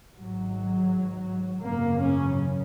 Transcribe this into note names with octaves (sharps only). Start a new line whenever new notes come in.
G#1 G#2 F#3
G#1 F#2 C#3 A#3
C#4